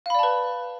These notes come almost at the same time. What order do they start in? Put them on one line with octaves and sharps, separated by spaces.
F5 B5 D5 A5 B4